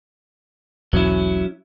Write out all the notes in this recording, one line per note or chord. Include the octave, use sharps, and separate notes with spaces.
E1 B1 E2 F#3 C#4 E4